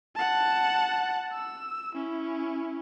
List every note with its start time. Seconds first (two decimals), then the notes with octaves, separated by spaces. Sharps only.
0.16 F#5 A5
1.33 E6
1.95 C#4 E4